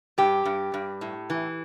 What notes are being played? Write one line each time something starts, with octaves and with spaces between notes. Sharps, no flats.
G2 G4
G2
G2
A2
E3